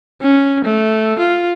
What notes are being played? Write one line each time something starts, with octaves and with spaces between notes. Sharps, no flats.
C#4
A3
F4